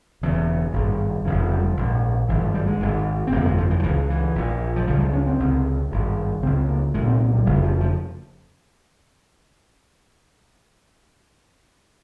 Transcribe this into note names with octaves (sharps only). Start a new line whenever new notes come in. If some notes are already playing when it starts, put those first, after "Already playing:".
E1 E2 C#3
G#1 G2
F1 F2 C#3 E3
E3
G3
F3
A#1 G#2
G#1 G2 E3
F3
G3
G#3
G#1 G#2
C4
G1 F2 C3 A#3
G#3
F3
E3
F3
C#2 C#3 E3
E3
A#1 A#2
F3
C#2 C#3 G3
F3
C#4
C4
C#2 C3
G#1 G2
C#2 C#3 C4
A#3
C2 A#2 G#3
C4
A#3
G3
F1 F2 C#3 F3
F3
F3